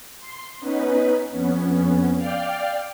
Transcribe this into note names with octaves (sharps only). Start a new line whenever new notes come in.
C6
B3 C#4 D#4 B4
F2 B3 C#4
D5 F5 G5 F6